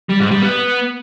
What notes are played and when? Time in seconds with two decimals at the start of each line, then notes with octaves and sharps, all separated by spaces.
0.09 G3
0.20 G#2
0.31 G3
0.42 B3